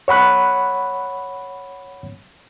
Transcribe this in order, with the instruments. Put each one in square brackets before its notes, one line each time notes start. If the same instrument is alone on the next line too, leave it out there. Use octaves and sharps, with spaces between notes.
[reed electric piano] C#5 F#5 B5 F#6